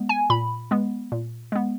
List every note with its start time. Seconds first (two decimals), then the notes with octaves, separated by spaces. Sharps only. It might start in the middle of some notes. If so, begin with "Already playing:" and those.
Already playing: G#3 B3
0.09 G#5
0.30 A#2 B5
0.71 G#3 B3
1.12 A#2
1.52 G#3 B3